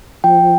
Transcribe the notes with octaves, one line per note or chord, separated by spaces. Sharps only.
F3 G5